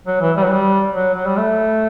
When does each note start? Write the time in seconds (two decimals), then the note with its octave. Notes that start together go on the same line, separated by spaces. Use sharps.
0.07 F#3
0.21 E3
0.37 G3
0.44 F#3
0.52 G3
0.94 F#3
1.14 F#3
1.26 G3
1.37 A3